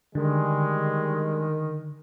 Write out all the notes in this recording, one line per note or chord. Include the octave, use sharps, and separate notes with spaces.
D3 D#3 G3 G#3